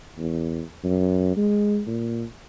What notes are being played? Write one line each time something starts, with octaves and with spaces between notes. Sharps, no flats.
E2
F#2
G#3
A#2